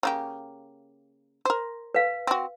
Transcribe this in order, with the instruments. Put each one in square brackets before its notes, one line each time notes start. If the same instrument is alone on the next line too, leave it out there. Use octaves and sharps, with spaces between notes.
[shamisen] C#3 A#3 G4
A#4 C5
[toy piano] B4 F5
[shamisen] C4 F#4